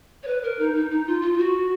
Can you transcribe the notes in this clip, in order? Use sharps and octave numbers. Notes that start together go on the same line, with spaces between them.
C#5
B4
A#4
D#4
D#4
D#4
F4
F4
F4
F#4